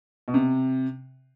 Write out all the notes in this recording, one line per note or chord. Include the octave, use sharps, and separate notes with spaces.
B2
C3